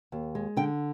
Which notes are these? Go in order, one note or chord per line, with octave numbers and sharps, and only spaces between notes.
D#2
G#3
D3 G5